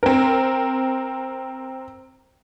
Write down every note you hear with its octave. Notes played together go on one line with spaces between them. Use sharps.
C4 A#4